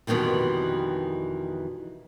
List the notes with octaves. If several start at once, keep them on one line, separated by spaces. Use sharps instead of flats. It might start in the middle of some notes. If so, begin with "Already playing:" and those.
F2 B2 D#3 E3 G3